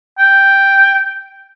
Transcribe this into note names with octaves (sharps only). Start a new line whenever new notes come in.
G5